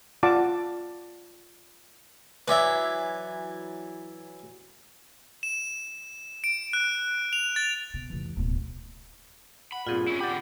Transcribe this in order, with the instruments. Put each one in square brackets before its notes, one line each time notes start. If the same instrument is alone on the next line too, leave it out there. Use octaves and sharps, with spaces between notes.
[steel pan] F4 D5 F#5 A5 D6
[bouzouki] E3 F#3 [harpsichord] B4 D5 E5
[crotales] E7
D7
F#6
F7
A6
[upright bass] B2
F1 E3
D1 B2
[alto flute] F#5 [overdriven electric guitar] B5
[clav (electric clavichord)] G2 A#2 [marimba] C4 F4 [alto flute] G#4
[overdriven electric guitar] C#4 E4
[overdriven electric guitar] D3 B5 [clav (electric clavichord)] G4 D5 [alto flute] F#5